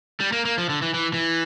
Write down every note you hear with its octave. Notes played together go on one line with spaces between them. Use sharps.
G3
A#3
A#3
F3
D3
E3
E3
E3